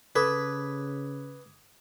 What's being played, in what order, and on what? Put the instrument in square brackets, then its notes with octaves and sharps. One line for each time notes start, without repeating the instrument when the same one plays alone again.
[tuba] C#3 [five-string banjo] A4 [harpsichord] B4 [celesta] D6 D#6 G#6